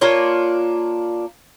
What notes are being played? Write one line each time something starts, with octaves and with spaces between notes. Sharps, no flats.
A#3 D4 F4 C#5